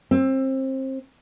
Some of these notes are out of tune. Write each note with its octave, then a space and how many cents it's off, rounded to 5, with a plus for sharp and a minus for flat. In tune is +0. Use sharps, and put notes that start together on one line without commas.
C4 +25